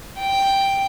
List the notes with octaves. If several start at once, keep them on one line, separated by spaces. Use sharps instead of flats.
G5